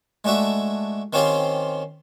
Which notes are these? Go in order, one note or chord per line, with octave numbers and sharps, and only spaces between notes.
G#3 A3 D4 F#4 E5
D#3 C4 C#4 F4 G4 C5